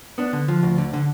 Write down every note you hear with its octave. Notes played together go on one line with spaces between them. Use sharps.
B3 D4
D3
F3
D2
D3
D3